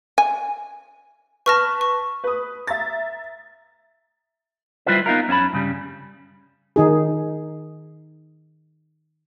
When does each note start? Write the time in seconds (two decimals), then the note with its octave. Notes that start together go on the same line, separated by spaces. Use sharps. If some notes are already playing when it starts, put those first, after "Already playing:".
0.18 G#5
1.46 B4 A5 C#6 F6 A#6 E7
1.81 C#6
2.24 B4 D#6
2.67 E5 A#5 A6
4.86 G3 E4 F4 B4 C5
5.06 B3 D#4 F4 A#4
5.28 F#2 C#4 D4 A5 B5
5.53 G2 C#3 G3
6.76 D#3 D#4 G#4